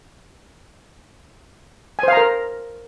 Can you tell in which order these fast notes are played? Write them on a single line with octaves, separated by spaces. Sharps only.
G#5 C5 F5 A#5 A#4